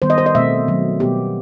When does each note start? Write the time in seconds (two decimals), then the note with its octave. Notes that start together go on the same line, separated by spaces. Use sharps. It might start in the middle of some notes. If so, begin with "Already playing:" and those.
0.02 D#3 G3 B3 C5
0.10 D#5
0.18 C5
0.26 D#5
0.35 B2 A3 C4 E5
0.68 D#3 F#3 A3
1.00 B2 G3 B3 G4